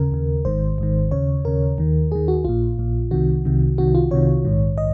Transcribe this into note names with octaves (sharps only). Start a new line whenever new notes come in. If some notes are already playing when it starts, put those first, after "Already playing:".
Already playing: D#2 C#3 A#4
D#2 C#3
G#1 G#2 D#3 C5
G#1 G#2 D#3
D#2 C#3 C#5
D#2 C#3 A#4
D#2 D#3
D#2 D#3 G#4
F#4
A#1 A#2 F4
A#1 A#2
C2 C3 D#3 F#4
C2 C3 D#3
C2 C3 D#3 F#4
F4
C2 C3 D#3 C#5
A#1 G#2 D#3
D#5